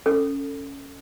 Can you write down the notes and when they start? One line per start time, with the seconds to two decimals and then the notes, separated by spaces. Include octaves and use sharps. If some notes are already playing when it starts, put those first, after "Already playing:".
0.06 C#4 A4